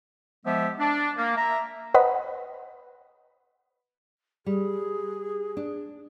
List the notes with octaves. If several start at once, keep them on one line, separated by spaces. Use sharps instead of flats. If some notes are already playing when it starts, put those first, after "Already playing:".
F3 G#3 B3 G4 E5
D4
A#3
E5 A#5
B4 C5 D#5 F#5 B5
G3 G#4
D4